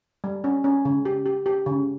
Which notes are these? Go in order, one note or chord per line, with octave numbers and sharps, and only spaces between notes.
G3
C#4
C#4
C#3
G4
G4
G4
C#3